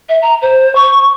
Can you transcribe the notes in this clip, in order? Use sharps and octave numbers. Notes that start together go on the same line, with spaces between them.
E5
A#5
C5
C#6